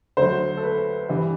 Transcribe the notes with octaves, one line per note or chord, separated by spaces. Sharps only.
D2 D3 F#3 C5
A4
B4
G2 E3 G3